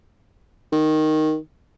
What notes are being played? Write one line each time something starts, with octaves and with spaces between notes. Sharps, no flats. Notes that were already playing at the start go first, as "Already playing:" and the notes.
D#3